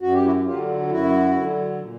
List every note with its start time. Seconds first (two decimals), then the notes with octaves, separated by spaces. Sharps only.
0.01 F#2 F#4
0.14 G4
0.26 E4 F#4
0.46 D3 F#3 F4 G4
0.91 F#2 E4 F#4
1.36 D3 F#3
1.80 A#2